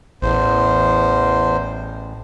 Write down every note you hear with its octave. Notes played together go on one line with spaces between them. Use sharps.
A1 E2 C5